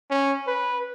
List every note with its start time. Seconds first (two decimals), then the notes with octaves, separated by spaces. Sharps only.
0.10 C#4
0.47 B4